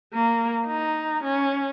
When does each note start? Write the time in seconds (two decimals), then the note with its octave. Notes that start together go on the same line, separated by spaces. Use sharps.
0.14 A#3
0.66 D#4
1.24 C#4